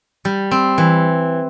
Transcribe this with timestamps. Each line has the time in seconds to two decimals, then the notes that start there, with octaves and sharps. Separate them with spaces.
0.25 G3
0.51 C4
0.78 E3